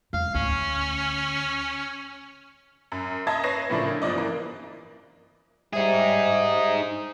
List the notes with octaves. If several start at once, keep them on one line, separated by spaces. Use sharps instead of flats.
E2 G#2 F5
D2 C#4
F#2
D#5 E5 A5 A#5 G#6
B4 C#5 A#6 C7 E7
A2 C#3 F3 A3 A#3 D4
G1 F3 D5 D#5
E3 A#3
G3 D#4 G#4 C5 E5